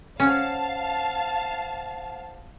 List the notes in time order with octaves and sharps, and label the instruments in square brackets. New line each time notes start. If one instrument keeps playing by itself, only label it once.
[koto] C#4 [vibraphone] C5 F#5 [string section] F5 A5